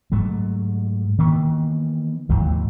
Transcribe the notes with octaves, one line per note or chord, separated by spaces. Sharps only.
G#2 F#3 A3
D#3 E3 A#3 B3
D#2 G#2 E3 F#3